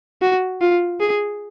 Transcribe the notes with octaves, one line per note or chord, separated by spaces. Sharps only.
F#4
F4
G#4